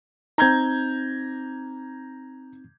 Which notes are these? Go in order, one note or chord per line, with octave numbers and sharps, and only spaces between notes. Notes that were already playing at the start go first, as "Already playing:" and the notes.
C4 D#4 A#5 G6 G#6